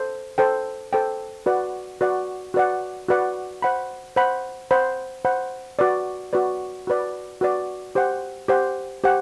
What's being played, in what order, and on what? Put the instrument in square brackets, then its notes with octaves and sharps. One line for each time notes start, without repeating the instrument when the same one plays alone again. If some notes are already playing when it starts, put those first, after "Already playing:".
Already playing: [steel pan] A4 C5
A4 C5 G5
A4 C5 G5
F#4 B4 D5 F#5
F#4 B4 D5 F#5
F#4 B4 D5 F#5
F#4 B4 D5 F#5
C5 F#5 B5
C5 F#5 B5
C5 F#5 B5
C5 F#5 B5
F#4 B4 D5
F#4 B4 D5
F#4 B4 D5
F#4 B4 D5
G4 C5 F#5
G4 C5 F#5
G4 C5 F#5